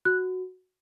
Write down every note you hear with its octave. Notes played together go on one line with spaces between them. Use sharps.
F#4 F#6